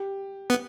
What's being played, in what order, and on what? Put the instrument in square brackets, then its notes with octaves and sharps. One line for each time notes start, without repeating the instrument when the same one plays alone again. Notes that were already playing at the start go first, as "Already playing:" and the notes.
Already playing: [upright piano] G4
[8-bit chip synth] B3